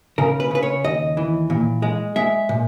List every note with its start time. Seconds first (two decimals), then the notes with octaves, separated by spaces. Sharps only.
0.18 C#3 A#4
0.40 B4
0.51 C#3 B4
0.63 C#5
0.84 D#2 D#5
1.17 E3
1.50 A#2
1.82 G#3
2.16 G#3 E5
2.49 A#2